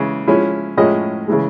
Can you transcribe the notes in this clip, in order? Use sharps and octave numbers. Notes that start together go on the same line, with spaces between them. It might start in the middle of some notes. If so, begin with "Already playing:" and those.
Already playing: C#3 E3 G#3
F3 G#3 C#4 E4
A2 F3 G#3 C#4 E4 D#5
C#3 E3 G#3